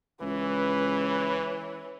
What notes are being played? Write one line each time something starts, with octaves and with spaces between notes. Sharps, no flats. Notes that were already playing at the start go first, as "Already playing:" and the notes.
C#2 E3 B4 C#5